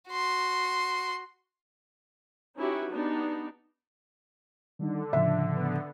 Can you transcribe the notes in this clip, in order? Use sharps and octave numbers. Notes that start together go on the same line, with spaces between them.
F#4 C6
C#4 D#4 E4 F#4 G4 B4
B3 D4 D#4 G4
D3 D#3 G3 D#4
A2 C#3 F3 E5
D3 B3